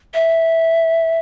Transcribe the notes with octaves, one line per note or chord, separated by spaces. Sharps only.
E5